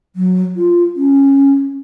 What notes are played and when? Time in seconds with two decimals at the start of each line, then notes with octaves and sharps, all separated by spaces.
0.16 F#3
0.56 F4
0.96 C#4